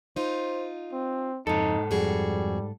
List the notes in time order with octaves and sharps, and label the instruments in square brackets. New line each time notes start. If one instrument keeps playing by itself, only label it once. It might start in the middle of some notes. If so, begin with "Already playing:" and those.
[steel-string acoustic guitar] D#4 F4 [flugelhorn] C5
[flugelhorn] C4
[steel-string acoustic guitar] F2 C#3 [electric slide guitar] G#2 A4 [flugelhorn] D#4
[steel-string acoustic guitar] F2 F#4 G#4 [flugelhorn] G3